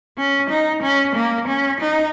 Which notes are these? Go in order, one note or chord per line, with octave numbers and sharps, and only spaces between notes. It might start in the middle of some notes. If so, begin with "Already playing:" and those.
C#4
D#4
C#4
A#3
C#4
D#4